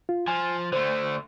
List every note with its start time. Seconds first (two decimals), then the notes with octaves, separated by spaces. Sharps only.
0.09 F4
0.28 F3 G#5
0.73 D3 A3 C5